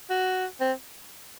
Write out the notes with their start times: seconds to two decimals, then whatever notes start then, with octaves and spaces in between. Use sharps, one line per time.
0.10 F#4
0.61 C4